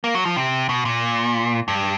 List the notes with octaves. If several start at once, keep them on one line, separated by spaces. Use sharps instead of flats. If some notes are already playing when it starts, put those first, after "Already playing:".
A#3
F#3
F3
C3
B2
A#2
G2